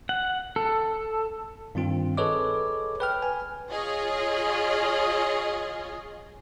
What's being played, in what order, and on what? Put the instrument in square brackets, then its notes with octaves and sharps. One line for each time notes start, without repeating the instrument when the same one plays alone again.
[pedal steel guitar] F#5
A4
[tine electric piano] G2 D#3 C4 F4
G#4 A4 B4 C#5 D#5 D6
B4 G5 F6
G#5
[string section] F4 G#4 C#5 D#5